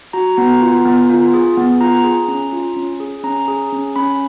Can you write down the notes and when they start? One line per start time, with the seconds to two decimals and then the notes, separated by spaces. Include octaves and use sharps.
0.13 F#4 A#5
0.37 B3 A#5
0.61 F4
0.85 B3
1.10 F4
1.34 G#4
1.57 B3
1.80 F4 A#5
2.04 G#4
2.28 C#4
2.53 F4
2.76 C#4
3.00 G#4
3.24 C#4 A#5
3.48 G#4
3.73 C#4
3.96 C#4 B5